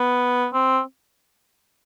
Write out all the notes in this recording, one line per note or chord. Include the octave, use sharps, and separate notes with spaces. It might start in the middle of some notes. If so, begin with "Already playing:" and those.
Already playing: B3
C4